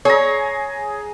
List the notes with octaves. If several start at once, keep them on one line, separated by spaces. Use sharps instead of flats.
G#4 C#5 A#5